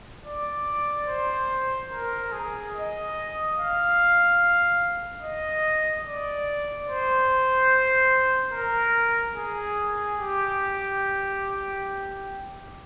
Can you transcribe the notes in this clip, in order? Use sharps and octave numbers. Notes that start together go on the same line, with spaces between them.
D5
C5
A#4
G#4
D#5
F5
D#5
D5
C5
A#4
G#4
G4